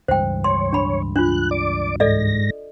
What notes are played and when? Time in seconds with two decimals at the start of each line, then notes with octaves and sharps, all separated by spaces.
0.08 C#2 G2 E3 C5 G5
0.44 C#5 C6
0.73 D4 B5
1.16 D4 F4 F#6
1.51 D5 D6
2.00 G#2 A4 D5 D#5 A#6